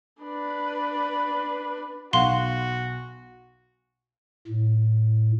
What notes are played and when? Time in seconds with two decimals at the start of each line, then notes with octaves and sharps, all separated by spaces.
0.22 D4 B4
2.13 B1 F#4 F5 F#5 C6
4.47 A2